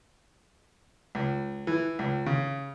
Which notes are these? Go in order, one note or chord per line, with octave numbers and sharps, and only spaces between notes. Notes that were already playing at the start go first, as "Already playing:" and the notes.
C#2
E3
C#2
C#3